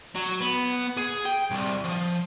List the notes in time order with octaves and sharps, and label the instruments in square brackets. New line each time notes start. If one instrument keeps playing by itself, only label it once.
[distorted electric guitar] F#3
B3
G#4
G5
C2
F3